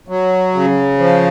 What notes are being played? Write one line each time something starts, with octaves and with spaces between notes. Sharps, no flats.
F#3
C#3
F3